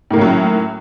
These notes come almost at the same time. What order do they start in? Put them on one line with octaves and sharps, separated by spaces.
A2 A#3 D#3 C#4 F#3